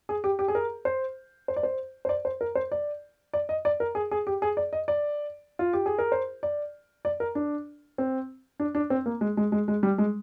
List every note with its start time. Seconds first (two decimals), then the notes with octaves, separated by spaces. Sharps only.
0.09 G#4
0.24 G4
0.39 G4
0.48 G#4
0.55 A#4
0.85 C5
1.48 C5
1.56 D5
1.63 C5
2.05 C5
2.09 D5
2.25 C5
2.41 A#4
2.55 C5
2.72 D5
3.34 D5
3.49 D#5
3.65 D5
3.80 A#4
3.95 G#4
4.11 G#4
4.27 G4
4.42 G#4
4.57 D5
4.73 D#5
4.88 D5
5.59 F4
5.73 G4
5.86 G#4
5.99 A#4
6.12 C5
6.43 D5
7.05 D5
7.20 A#4
7.35 D4
7.98 C4
8.60 D4
8.75 D4
8.90 C4
9.06 A#3
9.21 G#3
9.37 G#3
9.52 G#3
9.68 G#3
9.83 G3
9.98 G#3